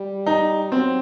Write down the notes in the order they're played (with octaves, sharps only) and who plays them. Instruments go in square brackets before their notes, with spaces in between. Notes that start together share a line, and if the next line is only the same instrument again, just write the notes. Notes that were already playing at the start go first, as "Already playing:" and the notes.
Already playing: [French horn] G3
[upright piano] D#4
[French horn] F#3 [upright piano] C4